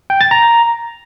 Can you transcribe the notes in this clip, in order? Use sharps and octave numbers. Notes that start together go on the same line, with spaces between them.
G5
A6
A#5